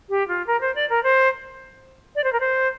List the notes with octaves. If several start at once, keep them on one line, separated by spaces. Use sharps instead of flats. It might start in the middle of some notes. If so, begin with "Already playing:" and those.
G4
F4
A#4
C5
D5
A#4
C5
D5
C5
A#4
C5